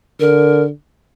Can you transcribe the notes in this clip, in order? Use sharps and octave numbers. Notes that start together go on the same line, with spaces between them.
D3 A#4